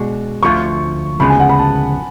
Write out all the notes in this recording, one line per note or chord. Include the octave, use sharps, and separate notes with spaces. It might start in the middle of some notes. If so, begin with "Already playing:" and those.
Already playing: B2 G#3 D4 F#4
D2 D3 F3 A3 F4 C#6
D2 C#3 F3 G#3 B3 B5
G#5
F#5
B5
A5